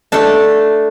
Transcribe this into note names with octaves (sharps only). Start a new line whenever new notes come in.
A3 D4 A4